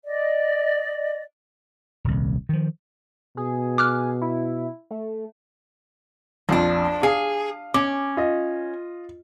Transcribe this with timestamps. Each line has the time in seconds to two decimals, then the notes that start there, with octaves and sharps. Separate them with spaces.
0.04 D5 D#5
2.04 D#1 C2
2.49 D#3 F3
3.37 B2 G#4
3.78 D6 F6 F#6
4.21 E4
4.91 A3
6.49 A#1 F2 F3 D4
7.03 G#4 F5
7.74 C#4 D6
8.17 F4 D#5